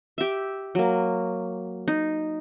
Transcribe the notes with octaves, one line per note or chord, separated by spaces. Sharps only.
G4 E5
F#3 A#3
D#4